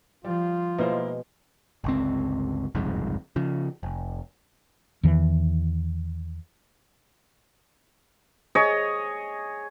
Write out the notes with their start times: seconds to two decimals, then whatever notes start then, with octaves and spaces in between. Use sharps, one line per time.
0.24 F3 G3 F4
0.78 B2 G#3 A#3 E4 C5
1.84 G1 C#2 C4
2.75 F#1 C2 F2 G#2
3.36 C#3 F3
3.83 F1
5.03 E2 D#3 E3
8.55 G#4 C#5 D#5